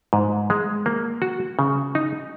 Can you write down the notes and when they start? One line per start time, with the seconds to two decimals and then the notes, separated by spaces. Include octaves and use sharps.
0.13 G#2
0.50 G#3
0.86 A#3
1.22 F#4
1.59 C#3
1.95 D#4